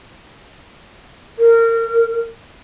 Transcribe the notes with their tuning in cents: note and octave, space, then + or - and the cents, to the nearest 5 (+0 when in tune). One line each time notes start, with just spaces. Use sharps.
A#4 -25